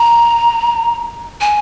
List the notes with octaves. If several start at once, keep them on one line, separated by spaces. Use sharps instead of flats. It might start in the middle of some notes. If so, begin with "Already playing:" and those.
Already playing: A#5
G#5